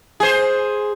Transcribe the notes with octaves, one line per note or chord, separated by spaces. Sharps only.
G#4 C5